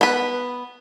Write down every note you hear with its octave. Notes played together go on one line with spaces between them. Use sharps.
B3 B4